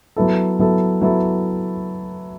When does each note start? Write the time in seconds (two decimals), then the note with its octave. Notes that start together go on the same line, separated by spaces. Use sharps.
0.16 F#3 B3 E4 A4
0.59 F#3 B3 E4 A4
1.01 F#3 B3 E4 A4